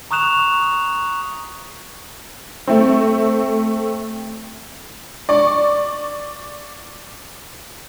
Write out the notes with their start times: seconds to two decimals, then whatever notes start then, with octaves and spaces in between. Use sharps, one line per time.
0.11 A#5 C#6 D#6 F#6 E7 F7
2.67 A3 C4
5.29 D5 C#6